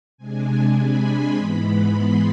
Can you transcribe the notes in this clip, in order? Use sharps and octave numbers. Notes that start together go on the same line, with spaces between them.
C3 G#3 D4 G#5
B5
C6
G#2 E3 G#3 B3 B5
B5
C6